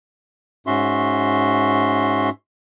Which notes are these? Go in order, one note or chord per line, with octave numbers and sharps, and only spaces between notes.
G#2 C#4 F#4 E5 C6